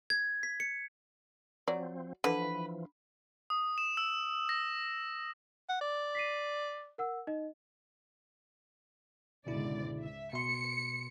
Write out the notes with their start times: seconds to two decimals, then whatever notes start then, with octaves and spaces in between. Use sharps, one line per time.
0.10 G#6
0.43 B6
0.60 C#7
1.68 F3 F#3 C4 D5
2.24 D3 E3 F3 B4
3.50 D#6
3.78 E7
3.97 E6
4.49 A#6
5.69 F#5
5.81 D5
6.15 B6 C7 D#7
6.98 A#4 F#5 E6
7.27 D#4 D#5
9.47 C#2 G#2 B2 D3 E4 D5
10.01 E5
10.33 B2 C6 C#7